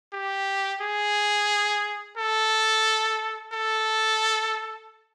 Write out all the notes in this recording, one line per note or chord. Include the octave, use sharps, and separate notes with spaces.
G4
G#4
A4
A4